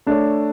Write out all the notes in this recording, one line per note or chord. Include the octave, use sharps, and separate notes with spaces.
A3 D4 A4 C#5